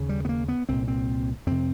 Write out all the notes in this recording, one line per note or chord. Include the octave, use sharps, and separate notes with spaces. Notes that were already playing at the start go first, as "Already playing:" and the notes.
Already playing: D#2 C#3
G3
B3
A#3
B3
C2 A#2 C4
C4
F2 C3 C4